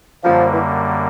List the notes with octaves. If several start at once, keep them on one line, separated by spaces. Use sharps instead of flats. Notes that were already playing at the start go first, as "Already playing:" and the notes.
F#2 D3 F3 G3 A#3
E3